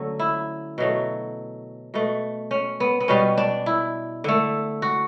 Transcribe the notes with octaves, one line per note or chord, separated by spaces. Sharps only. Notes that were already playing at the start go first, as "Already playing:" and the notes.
Already playing: D3 F#3 A3 C#4
E4
B2 F#3 A3
B2 A3
C#4
B3
B3
B2 G3 C#4
D4
E4
D3 A3
F#4